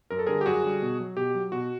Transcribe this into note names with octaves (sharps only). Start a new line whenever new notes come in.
F#2 A#4
A4
D3 G3 G#4 A#4
G4
F#2 F#4 G#4
D3 G3
B2
F#3
B2 G4
F#3
B2 F#4